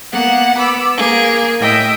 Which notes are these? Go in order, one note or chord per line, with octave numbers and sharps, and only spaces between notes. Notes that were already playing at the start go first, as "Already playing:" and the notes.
A#3 B3 F#5
B3 B5 D6 E6
A#3 G#4 A#4
A2 D#5 E5 G5 D#6